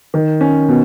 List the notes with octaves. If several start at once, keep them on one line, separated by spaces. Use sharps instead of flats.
D#3
C#4
B2